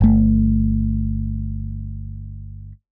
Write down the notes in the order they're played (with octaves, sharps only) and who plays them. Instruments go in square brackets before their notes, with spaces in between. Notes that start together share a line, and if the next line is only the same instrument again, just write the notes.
[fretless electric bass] G1 A3